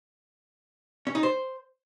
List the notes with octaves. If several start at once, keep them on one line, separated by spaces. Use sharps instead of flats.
C#4
D#4
C5